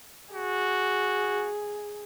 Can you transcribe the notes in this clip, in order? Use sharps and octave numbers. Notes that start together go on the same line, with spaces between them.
F#4 G#4